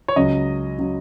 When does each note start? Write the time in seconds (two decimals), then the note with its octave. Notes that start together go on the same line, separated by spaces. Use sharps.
0.08 C#5
0.16 C#2 C#3 F#3 D#5
0.78 C#3 F#3